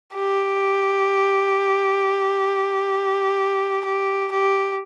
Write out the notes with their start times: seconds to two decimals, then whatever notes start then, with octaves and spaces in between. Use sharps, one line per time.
0.14 G4
3.85 G4
4.32 G4